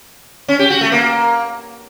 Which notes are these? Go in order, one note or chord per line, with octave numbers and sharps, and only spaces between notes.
C#4
G4
F#4
A3
A#3